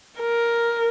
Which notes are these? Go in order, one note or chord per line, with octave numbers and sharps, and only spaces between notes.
A#4